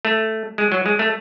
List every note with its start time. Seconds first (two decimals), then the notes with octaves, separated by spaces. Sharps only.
0.05 A3
0.58 G#3
0.72 F#3
0.86 G#3
0.99 A3